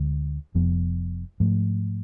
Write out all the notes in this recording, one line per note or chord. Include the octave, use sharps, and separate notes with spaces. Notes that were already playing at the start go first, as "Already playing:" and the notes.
Already playing: D2 D3 G#3
F1 F2 F3 B3
G#2 F3 A3